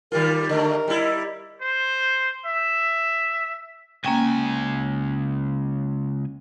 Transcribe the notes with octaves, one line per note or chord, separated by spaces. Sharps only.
D#3 G3 F4 A#4
D3 A3 A#4 D#5
G3 E4
C5
E5
C#2 A#3 C#4 G5 G#5